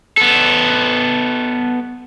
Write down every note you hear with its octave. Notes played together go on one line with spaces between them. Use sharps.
B3 A4